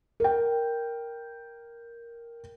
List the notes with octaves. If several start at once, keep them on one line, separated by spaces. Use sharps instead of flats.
A#4 G5